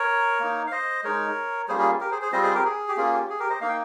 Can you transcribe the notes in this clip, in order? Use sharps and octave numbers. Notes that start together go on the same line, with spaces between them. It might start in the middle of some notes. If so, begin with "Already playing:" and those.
Already playing: A#4 C#5
A#3 D#4
F5
C5 D#5
G#3 D#4 A#4 C#5
G3 A#3 C#4 F4 G#4 C5
G#4
G4 A#4
G#4 C5
G#4 C5
G3 C4 F4 C5 D#5
G#4 C5
G4 A#4
G#4
G4
A#3 C#4 F4 G#4
G4
G#4
G4 A#4
C5 D#5
A#3 D#4 F5
G5